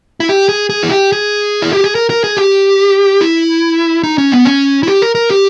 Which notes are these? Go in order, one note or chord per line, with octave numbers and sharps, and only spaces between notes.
E4
G4
G#4
G#4
E4
G4
G#4
E4
G4
G#4
A#4
A#4
G#4
G4
E4
D#4
C#4
B3
C#4
E4
G4
A#4
A#4
G4